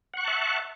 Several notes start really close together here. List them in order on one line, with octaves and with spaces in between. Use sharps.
F#5 C#6 F#6 A5 E5